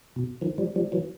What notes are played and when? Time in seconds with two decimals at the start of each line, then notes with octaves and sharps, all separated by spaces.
0.16 B2
0.41 D#3 F3
0.58 F3 G3
0.76 F3 G3
0.92 E3 F#3